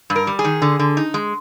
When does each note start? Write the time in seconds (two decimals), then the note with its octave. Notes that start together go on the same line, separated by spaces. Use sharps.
0.10 G2
0.16 A#4
0.27 G3
0.39 G#4
0.44 D#3
0.62 D3
0.79 D3
0.97 D#4
1.14 G#3